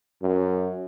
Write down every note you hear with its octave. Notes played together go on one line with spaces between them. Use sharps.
F#2